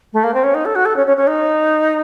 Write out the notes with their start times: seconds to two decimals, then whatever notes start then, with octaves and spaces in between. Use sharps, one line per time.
0.13 A3
0.24 A#3
0.34 C4
0.44 C#4
0.54 D#4
0.65 A4
0.75 F#4
0.85 A4
0.96 C#4
1.06 C#4
1.17 C#4
1.27 D#4